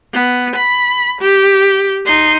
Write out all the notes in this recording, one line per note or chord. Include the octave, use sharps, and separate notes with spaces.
B3
B5
G4
D#4 C6